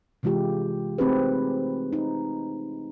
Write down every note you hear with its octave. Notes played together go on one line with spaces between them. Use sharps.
C3 E3 G#3 F4 G4
A3 C4 D#4 G4 G#4 B4
D#4